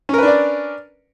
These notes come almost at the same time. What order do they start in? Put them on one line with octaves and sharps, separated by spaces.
C#4 A#4 B4 D4 D5